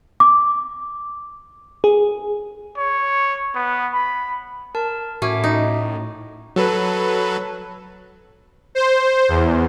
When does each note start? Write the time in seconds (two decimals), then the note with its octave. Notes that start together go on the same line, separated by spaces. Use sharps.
0.20 D6
1.84 G#4
2.77 C#5
3.55 B3
3.93 B5
4.75 A#4 A5
5.22 A2 C#4 F#4 E5 D6
5.44 D#4
6.56 F#3 A4 B4
8.75 C5
9.29 E2